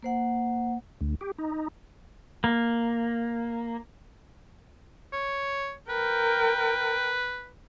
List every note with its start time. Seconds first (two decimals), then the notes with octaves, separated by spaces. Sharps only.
0.03 A#3 C5 F#5
1.01 D2
1.21 G4
1.38 D#4
2.44 A#3
5.13 C#5
5.90 A#4 B4 G5